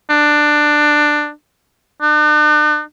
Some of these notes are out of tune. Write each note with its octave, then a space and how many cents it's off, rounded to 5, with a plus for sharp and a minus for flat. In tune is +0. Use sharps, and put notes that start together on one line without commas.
D4 +15
D4 +45